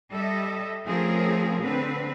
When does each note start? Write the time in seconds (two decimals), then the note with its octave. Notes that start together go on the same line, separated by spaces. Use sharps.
0.12 G3 A4 D#5 E5
0.86 F3 A3 C4 C#4 G#4 A#4
1.60 D3 C4 B4